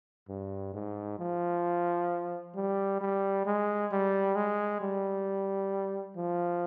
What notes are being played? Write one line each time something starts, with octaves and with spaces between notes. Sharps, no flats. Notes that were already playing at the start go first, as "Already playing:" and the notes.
G2
G#2
F3
G3
G3
G#3
G3
G#3
G3
F3